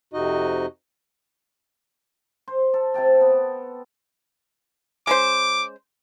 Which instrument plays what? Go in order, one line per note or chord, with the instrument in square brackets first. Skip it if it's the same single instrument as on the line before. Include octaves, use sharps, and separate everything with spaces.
[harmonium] F2 C3 D#4 F#4 D#5
[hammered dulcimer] C5
A4
C3 A4 G5 A5
B3
[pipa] G#3 C#4 C5 [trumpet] D6